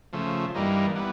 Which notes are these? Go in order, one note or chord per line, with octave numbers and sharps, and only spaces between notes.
C#3 F3 A3
G2 E3 G3 A#3 D#4
E3 G3 B3